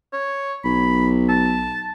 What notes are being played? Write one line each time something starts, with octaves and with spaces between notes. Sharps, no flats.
C#5
B1 B5
A5